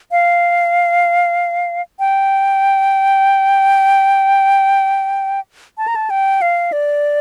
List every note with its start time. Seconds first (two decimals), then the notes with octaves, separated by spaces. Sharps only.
0.11 F5
1.99 G5
5.78 A5
5.88 A#5
5.96 A5
6.10 G5
6.42 F5
6.72 D5